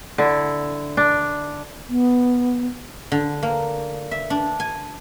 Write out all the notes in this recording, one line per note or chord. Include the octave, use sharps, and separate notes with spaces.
D3 E4
D4
B3
D3
A#3
E5
D4
G#5